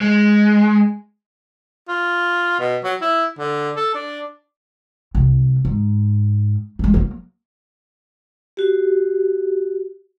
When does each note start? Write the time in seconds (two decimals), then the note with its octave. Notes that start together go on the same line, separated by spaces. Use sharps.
0.01 G#3
1.88 F4
2.59 B2
2.84 F#3
3.01 E4
3.39 D3
3.76 A4
3.95 D4
5.15 C2
5.65 G#2
6.79 G#3 A3
6.94 F#3 A#3
8.57 F#4 G4